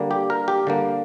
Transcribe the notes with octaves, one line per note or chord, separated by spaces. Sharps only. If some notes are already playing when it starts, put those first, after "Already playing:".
Already playing: D3 G3 A#3
G4
A#4
G4
D3 G3 A#3